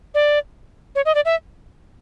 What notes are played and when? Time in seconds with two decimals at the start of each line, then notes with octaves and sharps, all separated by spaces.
0.14 D5
0.95 C#5
1.05 D#5
1.15 D5
1.25 E5